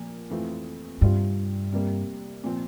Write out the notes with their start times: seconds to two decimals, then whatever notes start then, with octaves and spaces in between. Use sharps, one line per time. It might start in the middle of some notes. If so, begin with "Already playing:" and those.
Already playing: A#2 F3 A#3
0.30 F2 E3 A3 C4 F4
1.01 G2 C3 G3 C4 F4
1.72 C3 G3 A#3
2.44 A#2 F3 C4